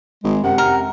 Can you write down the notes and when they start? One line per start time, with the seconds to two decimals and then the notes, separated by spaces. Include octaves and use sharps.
0.24 G#1 G#3
0.44 F#2 C3 F#5
0.58 F2 A#4